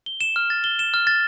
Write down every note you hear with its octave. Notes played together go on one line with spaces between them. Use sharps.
G7
E7
F6
A6
G7
E7
F6
A6